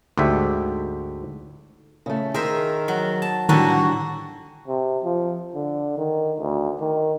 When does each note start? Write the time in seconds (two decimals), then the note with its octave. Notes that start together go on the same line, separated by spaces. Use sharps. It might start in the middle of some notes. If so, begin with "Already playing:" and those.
0.18 D2 G#2 D3 G4 E5
2.06 C#3 A3
2.34 D#3 G#4 A#4 C5 E5
2.88 F#3
3.22 A5
3.49 A2 D3 D#3 G3 F#4 G#5 A#5
4.67 C3
5.04 F3
5.55 D3
5.98 D#3
6.39 D2
6.80 D#3